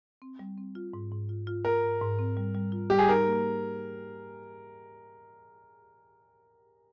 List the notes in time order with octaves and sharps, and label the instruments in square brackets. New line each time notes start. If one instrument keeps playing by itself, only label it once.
[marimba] C4
G3
C4
F4
G#2
G#2
F4
F4
[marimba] F4 [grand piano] A#4
[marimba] G#2
G#2
C4
G3
G3
F4
[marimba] G3 [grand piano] G4
[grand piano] G#4
[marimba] D#4 [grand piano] A#4
[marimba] A#3